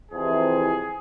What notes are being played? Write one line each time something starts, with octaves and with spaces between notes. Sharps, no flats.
F2 C3 E3 G#4